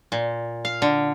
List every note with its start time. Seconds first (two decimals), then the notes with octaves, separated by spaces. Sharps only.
0.12 A#2
0.65 F5
0.82 D3